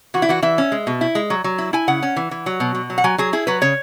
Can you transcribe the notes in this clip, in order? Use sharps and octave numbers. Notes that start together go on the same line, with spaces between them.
E3 F#4
E4
E3 F#4
E3 E5
C#4
G#3
B2
E4
G#3
F#3
F#3
E4
E4 G#5
C#3 F#5
C#4
E3
E3
F#3
B2
B2
F#3
F#5
F#3 G#5
F#3 G#4
E4 G#4
F#3 B4
C#3 C#5